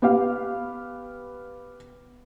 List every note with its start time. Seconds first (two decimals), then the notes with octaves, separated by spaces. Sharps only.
0.02 B3 G4 F5